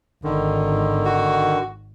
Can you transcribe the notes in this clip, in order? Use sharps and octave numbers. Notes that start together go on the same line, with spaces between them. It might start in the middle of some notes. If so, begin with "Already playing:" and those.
G#1 D3 D#3
F#4